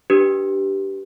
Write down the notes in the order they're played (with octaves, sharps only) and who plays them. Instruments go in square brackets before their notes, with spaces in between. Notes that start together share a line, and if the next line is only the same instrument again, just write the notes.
[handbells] D4 G4 B4